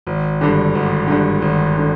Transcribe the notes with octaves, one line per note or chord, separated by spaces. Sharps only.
G#1
G2 D3
G#1
G2 D3
G#1
D3